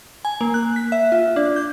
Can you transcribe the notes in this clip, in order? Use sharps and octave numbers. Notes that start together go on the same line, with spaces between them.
G#5
A#3
F#6
B6
E5
F4
D4
G6